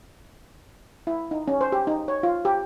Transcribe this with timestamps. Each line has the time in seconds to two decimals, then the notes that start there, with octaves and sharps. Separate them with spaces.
1.07 E4
1.31 D#4
1.48 C#4
1.61 C5
1.72 G4
1.87 D#4
2.08 C#5
2.23 F4
2.45 G4